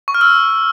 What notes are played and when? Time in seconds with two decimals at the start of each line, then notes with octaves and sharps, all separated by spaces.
0.08 C#6
0.14 F6
0.21 E6